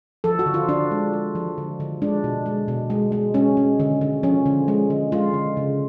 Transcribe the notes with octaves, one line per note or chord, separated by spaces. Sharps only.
F3 A4
F#4
D3
F4
D3 D4
G#3
G#3
F3
D3
D3
G#3 D4
B2
G#3
B2
G#3
G#3
G#3 C#4
G#3
D3
D3
F3 C#4
D3
G#3
D3
G#3 F4
D3
C#3